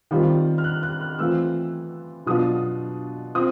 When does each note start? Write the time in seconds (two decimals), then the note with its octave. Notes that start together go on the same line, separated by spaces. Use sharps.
0.11 D#3 G3 C4 F4
0.58 F6
0.64 F#6
0.83 F#6
1.01 F6
1.19 E3 A3 C4 F4 E6
2.26 B2 F#3 B3 D4 F4 D#6
3.35 C4 F4 D#6